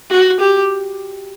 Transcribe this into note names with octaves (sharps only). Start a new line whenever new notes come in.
F#4
G4